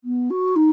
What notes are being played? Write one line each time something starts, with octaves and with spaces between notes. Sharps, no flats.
B3
F#4
D#4